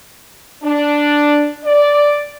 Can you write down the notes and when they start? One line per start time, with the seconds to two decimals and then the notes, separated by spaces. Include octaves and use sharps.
0.63 D4
1.65 D5